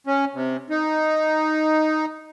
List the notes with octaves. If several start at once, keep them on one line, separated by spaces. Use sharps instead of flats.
C#4
C3
D#4